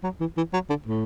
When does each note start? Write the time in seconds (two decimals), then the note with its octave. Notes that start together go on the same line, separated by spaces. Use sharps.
0.04 F#3
0.20 E3
0.37 E3
0.53 F#3
0.69 D3
0.86 A2